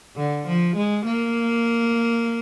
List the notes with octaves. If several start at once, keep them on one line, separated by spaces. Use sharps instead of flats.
D3
F3
G#3
A#3